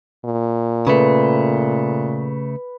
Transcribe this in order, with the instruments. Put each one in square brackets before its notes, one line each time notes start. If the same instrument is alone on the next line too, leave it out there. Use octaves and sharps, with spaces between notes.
[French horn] A#2
[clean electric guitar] C#3 A3 [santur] B4